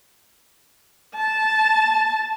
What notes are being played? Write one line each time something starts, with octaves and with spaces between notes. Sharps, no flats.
A5